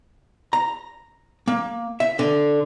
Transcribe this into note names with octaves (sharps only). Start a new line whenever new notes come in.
A#5
A#3
E5
D3